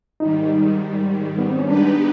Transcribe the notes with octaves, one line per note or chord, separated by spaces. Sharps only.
G#2 D#3 G3 D#4
B3
C4
C#4
G#3 B3 D4 D#4 G4 B4